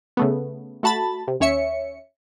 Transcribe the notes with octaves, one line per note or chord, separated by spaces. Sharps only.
C#3 A3 B3
A3 F#4 A5 B5 A6
C3
D#2 C#4 C#5 E5 C#7